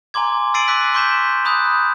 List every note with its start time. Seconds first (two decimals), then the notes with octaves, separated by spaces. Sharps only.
0.14 G#5 A#5 C6 D6 G#6
0.54 E6 A6 C7 D7 D#7 F#7
0.68 D6 E6 F#6 B6
0.94 C6 C#6 G6 B6 E7
1.45 B5 D#6 F#6 G6